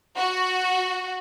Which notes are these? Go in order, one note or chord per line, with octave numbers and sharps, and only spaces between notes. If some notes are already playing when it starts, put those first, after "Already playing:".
F#4